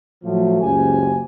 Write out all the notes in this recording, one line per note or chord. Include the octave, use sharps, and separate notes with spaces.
A2 F3 F#3 A3
F#1 C#2 F4 G4 C5 G#5